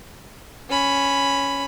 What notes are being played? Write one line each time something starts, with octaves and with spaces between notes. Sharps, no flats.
C#4 B5